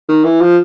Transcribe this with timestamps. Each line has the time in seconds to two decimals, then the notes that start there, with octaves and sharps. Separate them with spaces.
0.09 D#3
0.24 E3
0.41 F3